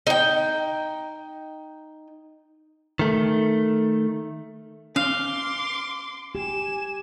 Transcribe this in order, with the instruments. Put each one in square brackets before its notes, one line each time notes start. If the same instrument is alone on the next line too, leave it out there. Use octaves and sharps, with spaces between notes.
[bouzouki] D#4 G5
[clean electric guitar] D#3 A3
[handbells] C#4 [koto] F5 [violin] C6 D6
[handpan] G4 [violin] G#5 E7